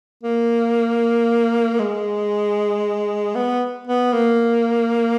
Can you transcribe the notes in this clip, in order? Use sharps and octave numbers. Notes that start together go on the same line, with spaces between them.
A#3
G#3
B3
B3
A#3